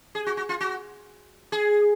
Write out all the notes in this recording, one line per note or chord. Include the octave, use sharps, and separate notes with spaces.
G#4
F#4
F#4
F4
F#4
G#4